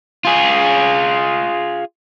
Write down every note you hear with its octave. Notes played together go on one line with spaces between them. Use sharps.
F4 G#4